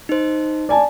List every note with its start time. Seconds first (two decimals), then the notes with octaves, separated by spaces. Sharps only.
0.09 D#4 C5
0.69 D5 G#5 A5